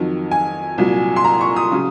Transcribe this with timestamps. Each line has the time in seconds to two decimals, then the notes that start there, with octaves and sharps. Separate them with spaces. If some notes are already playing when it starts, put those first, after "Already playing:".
Already playing: F2 D#3 F#3
0.31 G#5
0.78 C2 A#2 F#3
1.16 C6
1.24 A#5
1.41 C#6
1.56 D#6
1.72 C#3 F#3